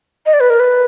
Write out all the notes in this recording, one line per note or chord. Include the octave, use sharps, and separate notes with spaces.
D#5
D5
B4
A#4
B4